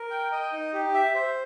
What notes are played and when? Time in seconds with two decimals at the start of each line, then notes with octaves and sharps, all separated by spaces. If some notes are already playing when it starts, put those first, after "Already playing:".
Already playing: A#4
0.10 G5
0.32 D#5
0.53 D#4
0.73 G4
0.94 E5
1.15 C5